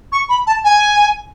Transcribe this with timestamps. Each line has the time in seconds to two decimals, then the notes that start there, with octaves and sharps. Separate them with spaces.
0.12 C#6
0.29 B5
0.47 A5
0.64 G#5